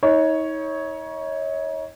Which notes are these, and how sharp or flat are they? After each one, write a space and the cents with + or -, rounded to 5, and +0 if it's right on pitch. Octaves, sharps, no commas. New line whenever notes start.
D#4 +35 C#5 +0